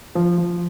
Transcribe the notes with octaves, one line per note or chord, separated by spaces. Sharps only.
F3
F3